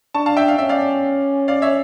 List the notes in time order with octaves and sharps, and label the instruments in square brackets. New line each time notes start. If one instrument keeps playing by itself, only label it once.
[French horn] D4 [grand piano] A5 C#6
[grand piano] F5 A5
E5 G5
F5
[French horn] C#4 [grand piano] E5
[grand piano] D5 F5
D5 F5
C#5 E5